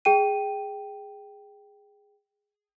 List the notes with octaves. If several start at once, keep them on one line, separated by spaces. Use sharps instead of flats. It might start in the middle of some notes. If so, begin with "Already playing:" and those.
G#4 G5 D#7